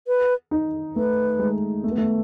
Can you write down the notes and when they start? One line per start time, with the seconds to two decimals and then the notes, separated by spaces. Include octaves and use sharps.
0.07 B4
0.51 D#4
0.96 A3 B4
1.39 G#3
1.84 A3
1.91 B3
1.98 A3